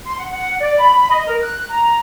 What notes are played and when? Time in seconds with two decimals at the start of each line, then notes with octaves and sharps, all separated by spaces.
0.05 C6
0.18 F#5
0.31 F#5
0.61 D5
0.79 B5
1.10 D#5
1.27 A#4
1.41 F#6
1.70 A#5